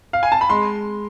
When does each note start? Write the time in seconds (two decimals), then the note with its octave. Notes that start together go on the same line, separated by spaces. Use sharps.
0.13 F5
0.23 G#5
0.32 A5
0.41 B5
0.50 G#3 C6